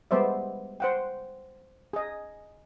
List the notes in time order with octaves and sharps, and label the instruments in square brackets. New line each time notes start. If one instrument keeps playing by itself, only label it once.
[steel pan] G3 G#3 B3 C5 D5 E5
C5 F#5 G5
G#4 D#5